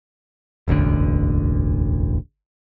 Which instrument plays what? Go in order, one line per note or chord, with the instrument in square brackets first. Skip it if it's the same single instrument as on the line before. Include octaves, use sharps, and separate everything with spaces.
[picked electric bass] E1 A1 D2 D3